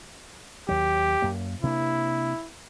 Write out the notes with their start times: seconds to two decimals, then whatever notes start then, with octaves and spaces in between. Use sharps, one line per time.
0.68 D#2 F#3 G4
1.22 F#2 A#3
1.63 C3 A#3 D4 E4